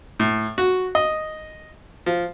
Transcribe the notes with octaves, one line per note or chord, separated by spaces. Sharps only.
A2
F#4
D#5
F3